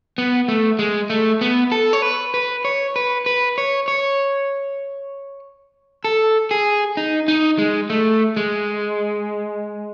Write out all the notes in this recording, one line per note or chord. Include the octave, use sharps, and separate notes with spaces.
B3
A3
G#3
A3
B3
A4
C#5
B4
B4
C#5
B4
B4
C#5
C#5
A4
G#4
D#4
D#4
G#3
A3
G#3